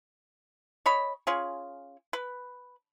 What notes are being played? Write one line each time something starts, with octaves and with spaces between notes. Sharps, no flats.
C#5 D#5 B5
C#4 F4 G#4
B4